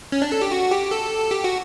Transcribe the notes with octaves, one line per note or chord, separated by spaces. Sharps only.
C#4
D4
A4
G4
F#4
G4
A4
G4
F#4